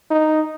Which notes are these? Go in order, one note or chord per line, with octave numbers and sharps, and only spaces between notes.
D#4